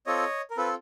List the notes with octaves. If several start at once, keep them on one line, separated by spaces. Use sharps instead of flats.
C4 F4 A4 C#5 D#5
A#4
C4 F4 A4 B4